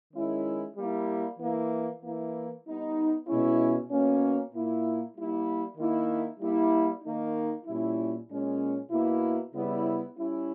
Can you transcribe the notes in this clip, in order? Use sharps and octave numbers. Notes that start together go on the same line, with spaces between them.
D#3 G#3 C#4 E4
G3 A#3 E4
E3 A#3 E4
E3 A#3 E4
G3 B3 D#4
B2 G#3 C#4 E4
B2 A#3 C#4
A#2 A#3 E4
G3 A#3 E4
D#3 A#3 E4
G3 A#3 E4
D#3 A#3 D#4
A#2 G3 C#4 E4
A#2 G#3 C#4
B2 A#3 E4
C#3 G3 B3 E4
G3 C#4 E4